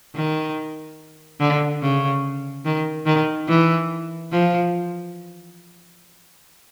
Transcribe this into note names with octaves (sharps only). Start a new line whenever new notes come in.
D#3
D3
C#3
D#3
D#3
E3
F3